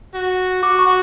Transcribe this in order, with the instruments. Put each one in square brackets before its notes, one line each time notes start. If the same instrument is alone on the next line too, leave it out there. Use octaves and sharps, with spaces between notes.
[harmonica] F#4
[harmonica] F#4 [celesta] D6
[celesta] C#6
[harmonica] F#4